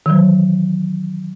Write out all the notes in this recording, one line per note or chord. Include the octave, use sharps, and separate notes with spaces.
D#3 E3 F#3